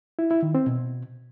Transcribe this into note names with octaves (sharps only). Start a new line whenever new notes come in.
E4
E4
D#3
C4
B2